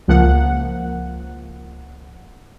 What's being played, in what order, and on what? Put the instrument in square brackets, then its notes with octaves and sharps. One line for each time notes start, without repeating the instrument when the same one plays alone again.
[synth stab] C#2 F3 A#3 F#5